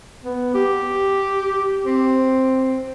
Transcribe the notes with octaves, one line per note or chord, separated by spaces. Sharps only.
B3
G4
C4